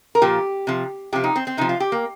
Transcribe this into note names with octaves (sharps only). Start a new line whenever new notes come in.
A#4
A#2 F3 G4
C3 F3
C3 F3 G4
D#4
C4
C4
C3 F3 D#4
F4
G4
A#3